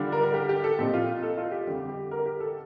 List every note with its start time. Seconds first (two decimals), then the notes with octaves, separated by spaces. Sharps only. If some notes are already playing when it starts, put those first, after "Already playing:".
Already playing: D3 G3 D4 F4
0.12 A#4
0.23 A#4
0.34 G4
0.49 G4
0.64 A4
0.79 A#2 F3 C4 D#4 G4
0.94 F4
1.23 A4
1.37 F4
1.52 G4
1.67 F2 D3 G3 G4
1.89 G4
2.11 A#4
2.26 G4
2.40 A4